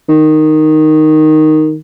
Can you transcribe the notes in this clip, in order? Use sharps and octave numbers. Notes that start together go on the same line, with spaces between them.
D#3